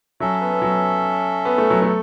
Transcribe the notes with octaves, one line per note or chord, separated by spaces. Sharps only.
F#3 C#4 A4 E5
B3
B3
F#3
B3
A3
F#3
A3
A4